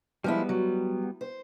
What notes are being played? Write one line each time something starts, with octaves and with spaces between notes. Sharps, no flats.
F3 G3 G#3 B3 E4
F#3
C5